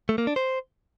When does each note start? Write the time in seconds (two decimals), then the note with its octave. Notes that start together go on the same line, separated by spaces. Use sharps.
0.09 A3
0.18 A#3
0.27 D4
0.36 C5